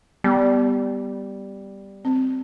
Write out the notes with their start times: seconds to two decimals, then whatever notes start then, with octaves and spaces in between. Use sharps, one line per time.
0.24 G3 B3
2.05 C4